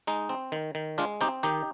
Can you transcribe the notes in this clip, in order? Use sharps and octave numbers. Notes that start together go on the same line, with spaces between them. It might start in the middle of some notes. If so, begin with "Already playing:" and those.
G#3 D#4
C4
D#3
D#3
G#3 D4 F4
C4 D#4 G4
D#3 D#4 G4